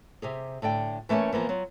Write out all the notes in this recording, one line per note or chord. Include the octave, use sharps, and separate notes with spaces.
C3 G4 G#4
A2 D3 D5 G5
E3 A3 A#3 C#4 C#5
E3 F3 A#3 B3
F#3 F4